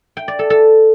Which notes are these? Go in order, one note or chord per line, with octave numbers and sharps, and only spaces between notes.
G5
D5
A4
A4